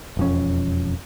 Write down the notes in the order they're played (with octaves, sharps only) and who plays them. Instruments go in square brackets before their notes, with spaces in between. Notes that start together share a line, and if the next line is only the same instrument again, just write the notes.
[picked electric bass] E1 F2 C#4